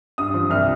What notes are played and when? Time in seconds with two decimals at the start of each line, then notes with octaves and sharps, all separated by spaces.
0.18 G2 D#6
0.34 F3
0.50 C2 F6